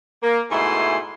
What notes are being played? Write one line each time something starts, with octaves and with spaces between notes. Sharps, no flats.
A#3
G#2 B2 A3 E4 G#5 C6